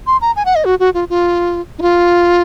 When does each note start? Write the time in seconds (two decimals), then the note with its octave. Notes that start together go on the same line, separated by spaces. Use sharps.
0.07 C6
0.21 A#5
0.36 G#5
0.46 F#5
0.55 D#5
0.65 F#4
0.80 F#4
0.94 F4
1.10 F4
1.79 D#4
1.82 F4